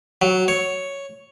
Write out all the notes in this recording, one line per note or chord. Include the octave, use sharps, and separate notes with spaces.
F#3
C#5